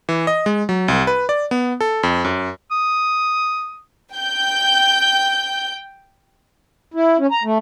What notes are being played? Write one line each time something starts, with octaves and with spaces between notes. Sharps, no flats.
E3
D#5
G#3
F#3
C2
B4
D5
B3
A4
F2
F#2
D#6
G5 G6
E4
C#4
A#5
A3